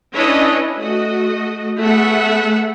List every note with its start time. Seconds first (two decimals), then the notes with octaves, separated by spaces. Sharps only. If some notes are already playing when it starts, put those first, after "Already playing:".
0.14 C#4 D4 E4 B4 C#5 D#5
0.77 A3 F#4 D#5
1.80 A3 B3 G#4 E5 F#5